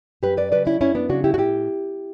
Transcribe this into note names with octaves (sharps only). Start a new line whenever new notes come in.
F#2 G4 B4
B4 D5
C#3 F#3 B4 D5
C#4 E4
F#2 C#4 E4
B3 D4
C#3 F#3 D4 F#4
E4 G4
F#4
A2 E4 G4